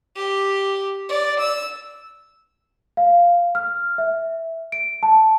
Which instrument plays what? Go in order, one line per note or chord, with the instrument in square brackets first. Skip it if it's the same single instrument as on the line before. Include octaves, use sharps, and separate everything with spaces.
[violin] G4
D5
E6
[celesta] F5
F6
E5
D7
A5